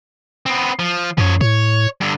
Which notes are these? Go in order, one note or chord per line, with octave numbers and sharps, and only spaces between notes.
B3 C4
F3
F#2 F3 C#5
A2 C#5
G2 D3